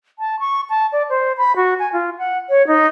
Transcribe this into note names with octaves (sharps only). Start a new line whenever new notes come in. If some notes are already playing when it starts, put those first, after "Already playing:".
A5
C#6
A5
D5
C5
B5
F#4
G#5
F4
F#5
C#5
D#4